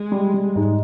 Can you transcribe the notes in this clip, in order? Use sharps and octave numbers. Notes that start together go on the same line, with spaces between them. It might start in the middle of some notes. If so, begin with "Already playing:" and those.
Already playing: G#3
G3
G3
G#2